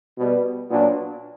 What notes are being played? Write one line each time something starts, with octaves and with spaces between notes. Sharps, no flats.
B2 G3 B3
A#2 F#3 B3 D4